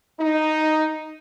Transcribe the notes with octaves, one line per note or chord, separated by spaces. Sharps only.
D#4